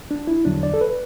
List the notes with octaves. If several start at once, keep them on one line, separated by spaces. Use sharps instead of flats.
D4
E4
E2 D3 F#3 D4
D5
A4
B4